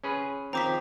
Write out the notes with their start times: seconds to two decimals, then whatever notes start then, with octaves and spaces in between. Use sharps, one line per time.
0.04 C#4 G#4 B4
0.53 D#3 F3 C4 A#5 D6 B6